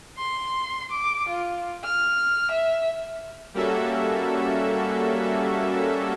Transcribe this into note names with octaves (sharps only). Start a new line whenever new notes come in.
C6
D6
F4
F6
E5
G3 A#3 C#4 F#4 A4 E5